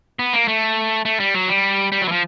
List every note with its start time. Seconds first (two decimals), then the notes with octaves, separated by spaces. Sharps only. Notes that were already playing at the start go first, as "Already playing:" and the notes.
0.19 B3
0.33 A#3
0.48 A3
1.05 A3
1.20 G3
1.35 F#3
1.48 G3
1.92 G3
2.02 F#3
2.08 E3
2.12 F3